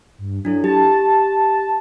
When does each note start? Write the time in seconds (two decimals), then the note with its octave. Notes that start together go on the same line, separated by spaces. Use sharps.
0.18 G2
0.45 F#3 D4 E4 A4
0.64 G4 A5